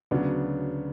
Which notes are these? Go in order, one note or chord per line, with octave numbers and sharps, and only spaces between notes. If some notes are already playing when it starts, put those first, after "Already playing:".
D2 C#3 F#3 B3 D4